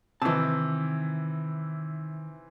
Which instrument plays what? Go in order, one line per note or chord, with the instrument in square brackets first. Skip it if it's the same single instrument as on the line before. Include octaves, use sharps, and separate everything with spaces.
[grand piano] C3 E3 [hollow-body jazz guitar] D#3 A5